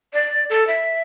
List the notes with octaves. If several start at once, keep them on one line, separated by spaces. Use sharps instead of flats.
D5
A4
E5